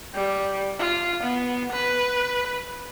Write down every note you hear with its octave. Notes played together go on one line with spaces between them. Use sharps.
G3
F4
B3
B4